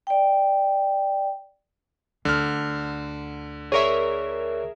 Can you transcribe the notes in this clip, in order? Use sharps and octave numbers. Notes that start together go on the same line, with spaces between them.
D5 G5
D2 D3 F6
G#4 A#4 C#5 D5 E5 C#6